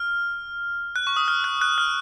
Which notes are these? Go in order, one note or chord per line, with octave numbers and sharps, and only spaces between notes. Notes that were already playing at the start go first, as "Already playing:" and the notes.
Already playing: F6
F#6
C#6
D#6
F6
F#6
F#6
F6